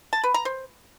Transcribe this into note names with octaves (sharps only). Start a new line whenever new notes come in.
A5
B4
A#5
C5